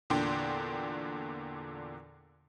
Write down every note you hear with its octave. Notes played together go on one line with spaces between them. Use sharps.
E2 A#2 D3 D4 G5 C6